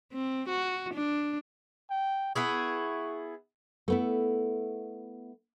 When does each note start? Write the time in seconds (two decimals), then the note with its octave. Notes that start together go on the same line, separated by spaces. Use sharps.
0.13 C4
0.49 F#4
0.94 D4
1.90 G5
2.36 B3 E4 G#4 C#6
3.88 A3 B3 E4